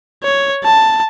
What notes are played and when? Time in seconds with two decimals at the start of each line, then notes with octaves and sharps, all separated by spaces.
0.24 C#5
0.64 A5